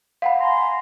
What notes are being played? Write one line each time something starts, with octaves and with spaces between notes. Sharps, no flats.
F5 F#5 B5
G#5 A#5 C6